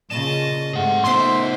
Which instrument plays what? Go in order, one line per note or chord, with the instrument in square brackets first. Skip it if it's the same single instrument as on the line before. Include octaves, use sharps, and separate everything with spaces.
[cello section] A#2 C#3 [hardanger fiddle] D#5 A5 [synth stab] E7
[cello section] G#2 C3 A3 [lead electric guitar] G#4 F#5
[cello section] A#2 A3 D#4 [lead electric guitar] C#3 B3 [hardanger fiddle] C5 E5 [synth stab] C6